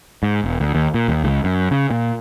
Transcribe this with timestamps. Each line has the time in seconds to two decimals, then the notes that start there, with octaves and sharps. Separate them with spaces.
0.23 G#2
0.44 E1
0.60 D2
0.75 D#2
0.94 A#2
1.08 D#2
1.24 C#2
1.44 F#2
1.71 C#3
1.91 A#2